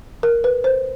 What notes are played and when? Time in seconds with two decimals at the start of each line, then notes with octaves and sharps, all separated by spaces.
0.23 A#4
0.44 B4
0.64 C5